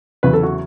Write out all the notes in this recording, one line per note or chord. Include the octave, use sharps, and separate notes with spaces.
E2 C#3 F#3 B4
A4
F#4